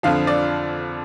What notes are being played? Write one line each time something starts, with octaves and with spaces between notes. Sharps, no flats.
F2 D3 F3 F5
D5